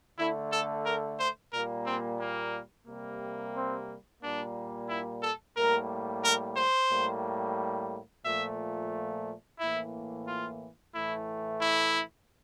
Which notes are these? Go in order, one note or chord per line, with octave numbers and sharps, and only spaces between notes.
D3 A3 E4
A4
A#4
C5
A#2 G3 A#3 A#4
C4
A#3
C3 G3 A#3
C4
A#2 G3 A#3 D4
E4
A4
A2 G3 A#3 A#4
A#4
C5
A2 G3 A#3
A#2 F3 A3 E5
A2 E3 A#3 E4
F4
A2 E3 A3 E4
E4